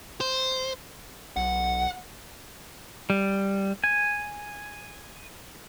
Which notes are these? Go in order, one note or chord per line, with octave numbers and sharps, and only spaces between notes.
C5
B1 F#5
G3
G#5